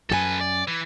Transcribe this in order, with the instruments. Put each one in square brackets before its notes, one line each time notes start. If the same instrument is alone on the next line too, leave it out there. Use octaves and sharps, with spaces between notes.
[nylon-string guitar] F#2 G4 G#5 [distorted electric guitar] A4 B4
[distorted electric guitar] D5
E3